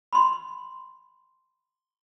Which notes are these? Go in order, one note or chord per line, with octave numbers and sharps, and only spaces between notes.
B5 C6